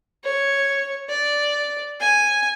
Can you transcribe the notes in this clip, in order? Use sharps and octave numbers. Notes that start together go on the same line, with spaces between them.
C#5
D5
G#5